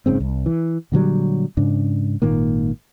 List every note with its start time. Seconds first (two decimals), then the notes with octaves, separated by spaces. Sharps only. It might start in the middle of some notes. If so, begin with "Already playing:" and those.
0.06 F#1 G#2 C#3 C4
0.20 C2
0.46 E3
0.92 A#2 D3 F#3 G3
1.57 G#2 C#3 D4
2.22 G#1 A#2 D#3 A#3